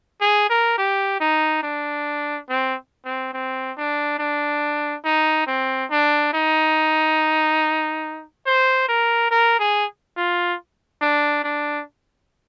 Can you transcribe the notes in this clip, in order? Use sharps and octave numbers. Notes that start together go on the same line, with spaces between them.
G#4
A#4
G4
D#4
D4
C4
C4
C4
D4
D4
D#4
C4
D4
D#4
C5
A#4
A#4
G#4
F4
D4
D4